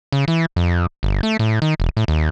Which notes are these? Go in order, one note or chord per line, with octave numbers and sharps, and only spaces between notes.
C#3
E3
F2
G1
A3
A2
D#3
E1
A2
D#2